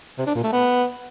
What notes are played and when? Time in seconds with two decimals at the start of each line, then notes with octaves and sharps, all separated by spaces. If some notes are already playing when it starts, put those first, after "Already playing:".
0.18 C3
0.27 D4
0.35 A#2
0.44 A3
0.52 B3